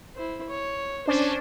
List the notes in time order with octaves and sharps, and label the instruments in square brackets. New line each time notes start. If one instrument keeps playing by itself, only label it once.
[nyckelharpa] E4 C5
C#5
[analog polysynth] C#4 D4 [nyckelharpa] C5